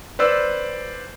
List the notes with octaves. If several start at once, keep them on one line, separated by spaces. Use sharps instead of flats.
B4 C5 D5 E6